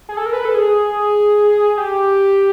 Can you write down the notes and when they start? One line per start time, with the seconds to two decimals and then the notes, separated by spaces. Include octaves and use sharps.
0.09 G#4
0.17 A4
0.26 A#4
0.33 B4
0.45 A4
0.55 G#4
1.78 G4